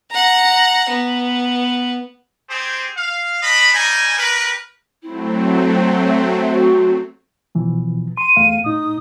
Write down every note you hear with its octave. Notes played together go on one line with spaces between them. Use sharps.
F#5 A#5
B3
C4 G4 G#4 C5
F5
D4 D#5 B5
G3 D#4 G#5
G4 A#4 B4
F#3 A3 C4 E4
E5
F#4
B2 E3 F3
C6 D#7
E2 A3 F5
A2 D#4 D#6